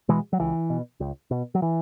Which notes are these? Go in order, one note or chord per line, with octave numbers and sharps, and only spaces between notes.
B2 E3 G#3
F#3
C#2 E3
B2
C#2
B2
F#3
E3